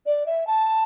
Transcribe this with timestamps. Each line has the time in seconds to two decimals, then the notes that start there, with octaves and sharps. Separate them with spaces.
0.06 D5
0.26 E5
0.47 A5